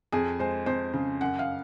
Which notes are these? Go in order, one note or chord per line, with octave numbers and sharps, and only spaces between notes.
F2 G#4
G#3 C5
F2 C5
C#3
F#2 F#5
F5